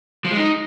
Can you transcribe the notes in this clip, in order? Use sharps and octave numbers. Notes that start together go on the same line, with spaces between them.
F3
G#3
D#4